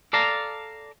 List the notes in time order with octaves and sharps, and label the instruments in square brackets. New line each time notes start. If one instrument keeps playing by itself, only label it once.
[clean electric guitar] A4 D5 F5 A5 A#5